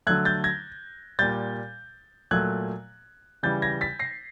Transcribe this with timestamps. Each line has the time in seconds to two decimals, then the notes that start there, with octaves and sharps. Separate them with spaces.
0.07 D3 F#3 A3 F#6 G#6
0.25 G6 A6
0.44 G#6 A#6
1.19 A#2 G3 G6 A6
2.31 A#2 F#3 A3 F#6 G#6
3.43 C#3 E3 G3 G6 A6
3.62 G#6 A#6
3.81 A6 B6
3.99 A#6 C7